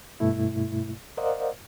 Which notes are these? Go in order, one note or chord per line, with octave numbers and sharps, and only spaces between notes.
G2 B2 A3 E4
A#4 C5 D5 D#5 F5 F#5